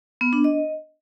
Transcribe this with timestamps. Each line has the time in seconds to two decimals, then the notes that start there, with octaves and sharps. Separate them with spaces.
0.21 B3
0.33 D4
0.44 D#5